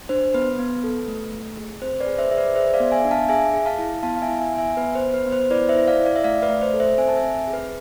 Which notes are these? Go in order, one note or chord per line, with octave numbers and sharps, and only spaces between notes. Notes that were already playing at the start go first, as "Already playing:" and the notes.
D4 C5
B3 B4
B3
A4
A3
A3
G#4
C4 C5
B4 D5
G#4
C5 E5
G#4 E5
B4 D5
G#4 C5 E5
D5 F5
B3
E5 G#5
D4
F5 A5
G#4 E5 G#5
G#4
F5 A5
E4
B3 F5 A5
F5
E5 G#5
E4
E5 G#5
B3
E5 G#5
B3 B4
C5
B3
B4
B3
C5
E4 B4 D5
C5 E5
E4
D5 F5
E4
D5 F5
E5
A3 D5 F5
B4 D5
A3
C5
A4
C5 E5
C4 E5 G#5
A5
E5 G#5
C4
G#4
B4